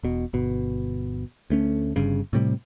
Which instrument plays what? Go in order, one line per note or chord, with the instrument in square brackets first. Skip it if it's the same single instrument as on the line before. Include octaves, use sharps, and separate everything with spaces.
[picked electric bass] E1 B2
G1 B2
D2 A3 C#4
G1 G2 C#3
A2 C3 G3